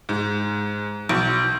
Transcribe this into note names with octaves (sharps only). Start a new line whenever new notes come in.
G#2
B1